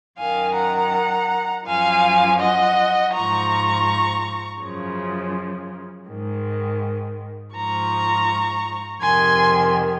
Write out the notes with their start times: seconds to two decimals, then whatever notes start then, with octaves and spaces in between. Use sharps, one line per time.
0.18 F#2 D#3 F5 G#5
0.56 F#5 A#5
1.66 F#2 F3 F5 G#5
2.40 D#5 F#5
3.13 G#2 F3 A#5 C#6
4.61 F#2 C#3 F3
6.08 G#2 D#3
7.55 G#2 F3 A#5 C#6
9.02 F2 C3 D#3 G#5 C6